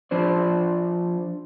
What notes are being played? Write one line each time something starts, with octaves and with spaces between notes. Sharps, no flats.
F3 D4 C5 D5